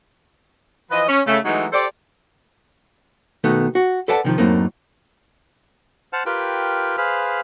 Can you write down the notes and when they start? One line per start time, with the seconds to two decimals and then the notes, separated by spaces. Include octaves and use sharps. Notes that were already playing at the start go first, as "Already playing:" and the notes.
0.91 E3 F3 B4 D#5
1.08 C#4
1.27 C#3 A3
1.45 E3 F#3 G#3 A3 D#4
1.73 G4 A4 C5 D5
3.44 B2 D#3 A3 B3
3.75 F#4
4.08 A4 B4 D5 F#5 A5
4.25 C3 D#3 F3
4.38 F#2 A2 A#3 C4 D#4
6.13 C5 F#5 A5 F6
6.26 F4 G4 A#4 B4 G5
6.98 G#4 B4 C5 F5 B5 F6